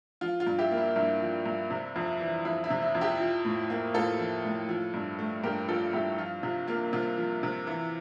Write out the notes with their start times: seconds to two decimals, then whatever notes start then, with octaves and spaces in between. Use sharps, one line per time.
0.21 F3 F4
0.40 F4
0.47 G2
0.58 E4 G4
0.71 A#3
0.77 E4
0.96 G2 E4
1.21 F3
1.46 G2
1.70 C3
1.96 F2
2.21 E3
2.45 F2 E4
2.64 E4
2.70 C3
2.83 E4
2.95 F2
3.01 E4 G4
3.20 F3
3.45 A2
3.70 A#3
3.94 A2 F4 A4
4.19 F3
4.45 A2
4.69 F3
4.94 G2
5.19 A3
5.44 G2 G4 A#4
5.68 F3 F4 A4
5.93 G2 E4 G4
6.18 F3 F4
6.43 C3 F4
6.68 A#3 F4
6.93 C3 F4
7.18 F3
7.43 C3
7.67 E3